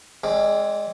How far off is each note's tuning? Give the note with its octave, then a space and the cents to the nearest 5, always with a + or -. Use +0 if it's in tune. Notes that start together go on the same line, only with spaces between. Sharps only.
G#3 +0 C4 +20 D5 -25